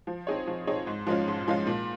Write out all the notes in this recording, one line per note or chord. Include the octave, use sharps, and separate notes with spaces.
F3
C4 D#4 G#4 C#5
F3
C4 D#4 G#4 C#5
G#2
F3 G#3 C#4 F4
G#2
F3 G#3 C#4 F4
A#2